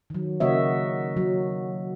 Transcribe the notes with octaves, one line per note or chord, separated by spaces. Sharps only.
D#3 F#3
C#3 A#3 F#4 C#5 D#5 E5
F#3